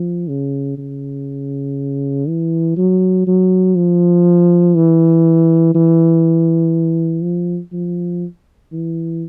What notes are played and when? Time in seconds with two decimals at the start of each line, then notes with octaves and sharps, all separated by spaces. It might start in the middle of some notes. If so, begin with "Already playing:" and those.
Already playing: F3
0.29 C#3
0.78 C#3
2.28 E3
2.77 F#3
3.27 F#3
3.75 F3
4.75 E3
5.75 E3
7.23 F3
7.73 F3
8.73 E3